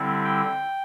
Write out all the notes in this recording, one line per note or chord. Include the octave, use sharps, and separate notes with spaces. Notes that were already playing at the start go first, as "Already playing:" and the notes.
Already playing: D3 G3 C4 E4
G5